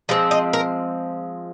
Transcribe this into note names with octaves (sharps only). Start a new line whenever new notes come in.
F3 G#3 C4
D#5
A#4